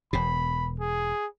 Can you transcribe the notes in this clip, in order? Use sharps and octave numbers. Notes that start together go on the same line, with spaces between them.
E1 B2 B5
G#4